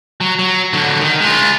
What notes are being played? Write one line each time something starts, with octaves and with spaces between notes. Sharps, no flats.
F#3
F#3
D3 F#3
D#3
G#3 F4